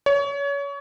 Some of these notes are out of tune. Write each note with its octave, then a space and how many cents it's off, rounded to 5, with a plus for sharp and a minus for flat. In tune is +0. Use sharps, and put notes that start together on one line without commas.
C#5 +30